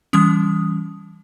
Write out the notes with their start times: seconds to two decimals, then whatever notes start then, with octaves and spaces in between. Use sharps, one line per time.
0.13 E3 G3 C#4 D#6